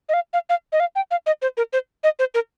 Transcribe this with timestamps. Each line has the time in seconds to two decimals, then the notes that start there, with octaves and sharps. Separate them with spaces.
0.09 D#5
0.14 F5
0.33 F5
0.49 F5
0.72 D#5
0.80 F5
0.96 G5
1.11 F5
1.26 D#5
1.42 C5
1.57 A#4
1.73 C5
2.04 D#5
2.19 C5
2.34 A#4